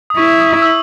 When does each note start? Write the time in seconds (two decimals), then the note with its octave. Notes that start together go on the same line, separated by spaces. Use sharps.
0.10 D#6
0.17 E4 C#6
0.41 D#6
0.62 E6